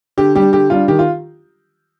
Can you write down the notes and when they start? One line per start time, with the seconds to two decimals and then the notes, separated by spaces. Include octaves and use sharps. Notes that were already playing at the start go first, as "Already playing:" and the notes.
0.17 D3 G4
0.35 G3 D4 G4
0.53 D3 G4
0.70 G3 D4 F4
0.88 D#3 G4
0.99 F4